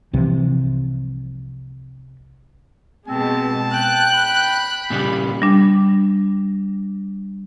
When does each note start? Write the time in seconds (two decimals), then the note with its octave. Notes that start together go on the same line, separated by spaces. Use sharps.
0.13 C2 C3 E3 F3
3.08 B2 G#3 C4 A5
3.74 G5 F#6
4.14 B5
4.90 A#2 C#3 G3
5.42 G3 D4